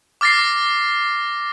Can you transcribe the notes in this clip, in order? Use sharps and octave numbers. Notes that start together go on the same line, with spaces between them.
D6 F6 A6 A#6 C7